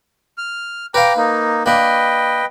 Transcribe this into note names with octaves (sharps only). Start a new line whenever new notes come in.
F6
B4 F5 G5 A#5 D6
A#3 D#4
A#3 D4 B4 D#5 G5